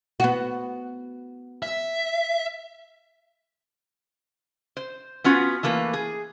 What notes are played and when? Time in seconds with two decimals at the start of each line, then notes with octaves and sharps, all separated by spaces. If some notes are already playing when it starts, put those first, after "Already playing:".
0.20 B3 F#4
1.63 E5
4.77 C5
5.24 B3 C#4 F4 F#4
5.63 E3 A3 A#3 B4
5.93 G#4